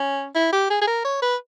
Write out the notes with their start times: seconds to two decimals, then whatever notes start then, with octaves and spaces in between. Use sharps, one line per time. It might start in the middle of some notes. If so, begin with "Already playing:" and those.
Already playing: C#4
0.35 E4
0.53 G4
0.70 G#4
0.81 G#4
0.87 A#4
1.05 C#5
1.22 B4